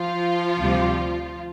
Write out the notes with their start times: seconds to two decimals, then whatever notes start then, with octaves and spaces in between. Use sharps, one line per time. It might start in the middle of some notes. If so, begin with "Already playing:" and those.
Already playing: F3 F4
0.59 D2 C3 G3